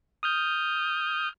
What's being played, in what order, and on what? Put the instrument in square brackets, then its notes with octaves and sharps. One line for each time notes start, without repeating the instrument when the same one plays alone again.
[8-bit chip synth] D#6 F6 G6